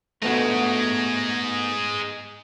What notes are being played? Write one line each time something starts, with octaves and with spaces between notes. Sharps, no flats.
G#3 A3 B3 D#4 F#4